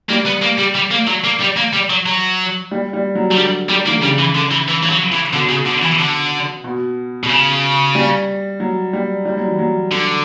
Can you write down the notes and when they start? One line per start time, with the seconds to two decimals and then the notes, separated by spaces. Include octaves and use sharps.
0.10 G3 A#3
0.26 B3
0.42 A#3
0.59 G3
0.75 G3
0.91 A#3
1.08 F#3
1.24 A#3
1.40 G3
1.57 A#3
1.73 G3
1.90 F#3
2.06 F#3
2.71 G3
2.93 G3
3.15 F#3
3.32 F#3
3.37 D3 G3
3.69 G3
3.86 E3 A#3
3.95 D3
4.02 C#3 G3
4.19 E3
4.35 D3
4.51 E3
4.68 E3
4.83 E3
4.90 F#3
5.12 E3
5.33 B2 D3
5.49 C#3
5.66 D3
5.82 E3
5.99 D3
6.64 B2
7.24 B2
7.29 C#3
7.95 G3
8.60 F#3
8.93 G3
9.25 G3
9.37 F#3
9.47 E3
9.59 F#3
9.92 D3